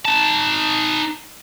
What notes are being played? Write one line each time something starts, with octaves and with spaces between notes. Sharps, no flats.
D#4 A5